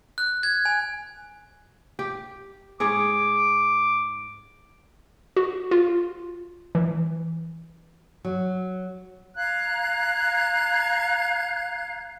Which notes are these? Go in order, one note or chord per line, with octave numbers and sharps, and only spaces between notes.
F#6
G#6
G#5
G4
G#2 G#4 C#5 D6
F#4
F4
E3
F#3
F5 A#5 F#6 G#6